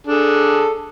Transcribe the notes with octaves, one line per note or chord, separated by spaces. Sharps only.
D4 G#4 A4